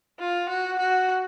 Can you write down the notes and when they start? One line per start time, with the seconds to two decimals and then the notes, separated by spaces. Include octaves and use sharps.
0.20 F4
0.49 F#4
0.79 F#4